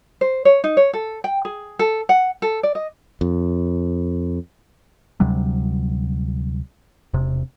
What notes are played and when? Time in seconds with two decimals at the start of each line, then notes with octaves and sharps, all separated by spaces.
0.21 C5
0.45 C#5
0.64 D#4
0.77 C#5
0.93 A4
1.24 G5
1.45 G#4
1.79 A4
2.09 F#5
2.42 A4
2.63 D5
2.75 D#5
3.21 F2
5.20 D2 C3 F#3 G3
7.14 E1 C3